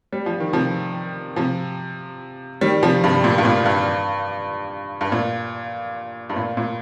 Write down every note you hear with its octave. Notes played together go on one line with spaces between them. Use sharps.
G3
F3
D#3
C3 F3
C3 F3
D#3 G3
C3 F3
G2 C3
A#2
G2
A#2
G2
G2
A#2
G2
A#2
A#2